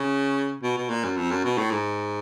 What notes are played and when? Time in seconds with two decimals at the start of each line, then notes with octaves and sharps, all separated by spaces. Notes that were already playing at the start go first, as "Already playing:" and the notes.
Already playing: C#3
0.63 B2
0.77 B2
0.90 A#2
1.04 F#2
1.17 F2
1.31 F#2
1.44 B2
1.58 A2
1.71 G#2